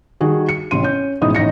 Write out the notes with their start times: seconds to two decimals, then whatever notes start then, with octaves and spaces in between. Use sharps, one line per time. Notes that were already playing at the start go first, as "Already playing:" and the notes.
0.21 D#3 G3 F#4 G#4
0.49 C#7
0.71 A1 C3 C6 D#7
0.83 C#4 G6
1.21 A1 G#2 B2 D#4 E4 D#6
1.35 A1 D#4 A#6 C#7